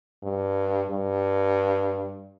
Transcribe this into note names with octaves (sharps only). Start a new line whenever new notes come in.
G2
G2